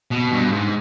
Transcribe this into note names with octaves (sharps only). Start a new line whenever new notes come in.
B2
G2
G#2